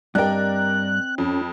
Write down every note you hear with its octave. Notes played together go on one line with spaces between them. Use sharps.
G2 C4 A#4 D5 D#5 G5 F#6
F2 C#4